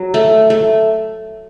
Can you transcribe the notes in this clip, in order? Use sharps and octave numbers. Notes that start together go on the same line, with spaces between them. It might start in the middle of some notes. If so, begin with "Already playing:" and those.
Already playing: F#3
A3
A3